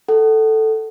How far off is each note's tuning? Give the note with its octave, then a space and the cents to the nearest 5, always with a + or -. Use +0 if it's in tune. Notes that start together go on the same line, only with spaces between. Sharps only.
A4 +0 F#5 +35